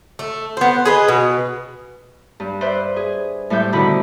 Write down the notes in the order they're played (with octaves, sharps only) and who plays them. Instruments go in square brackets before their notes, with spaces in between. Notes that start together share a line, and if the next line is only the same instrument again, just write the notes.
[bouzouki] A3
B3 C5
G#4 B4 D#5
B2
[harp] G2
B4 C5 D5 E5
G#4
A2 G3 C5 E5 G6
B2 D3 D#3 E4 B5